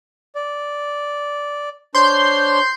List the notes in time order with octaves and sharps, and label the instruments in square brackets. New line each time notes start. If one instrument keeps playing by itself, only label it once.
[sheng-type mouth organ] D5
[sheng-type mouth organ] D4 C5 C#5 [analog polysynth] C6 G6